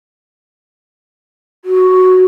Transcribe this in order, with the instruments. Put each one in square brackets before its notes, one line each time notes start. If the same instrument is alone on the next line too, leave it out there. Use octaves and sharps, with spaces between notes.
[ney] F#4